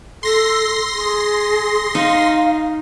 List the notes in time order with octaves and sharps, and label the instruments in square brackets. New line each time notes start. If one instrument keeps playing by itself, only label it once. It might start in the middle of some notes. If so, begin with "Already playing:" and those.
[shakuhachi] A4 [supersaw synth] C6 A#6
[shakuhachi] G#4
[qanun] D#4 [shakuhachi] F5